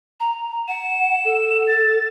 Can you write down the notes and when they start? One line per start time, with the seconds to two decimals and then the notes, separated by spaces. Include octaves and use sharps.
0.20 A#5
0.68 F#5 E7
1.25 A4
1.67 A6